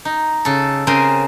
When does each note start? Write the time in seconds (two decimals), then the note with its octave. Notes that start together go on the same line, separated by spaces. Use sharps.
0.05 D#4
0.45 C#3 A4
0.87 C#3 C4 G#4 A#4 G5 G#5